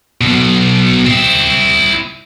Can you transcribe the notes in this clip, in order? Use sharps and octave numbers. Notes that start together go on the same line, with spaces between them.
B1 B2
C4 E4